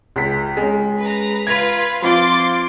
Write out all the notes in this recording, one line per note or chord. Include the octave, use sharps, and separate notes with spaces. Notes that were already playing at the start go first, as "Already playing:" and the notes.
C#2 B6
G#3 C#4
B4 A#5
F4 B4 G#6 F7
F3 C4 F4 C6 D6 A6